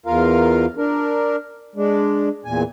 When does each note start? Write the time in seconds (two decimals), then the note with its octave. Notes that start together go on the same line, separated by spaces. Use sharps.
0.06 E2 F4 A#4 F5
0.77 D4 A#4
1.76 G#3 D4
2.45 E2 A#2 G#5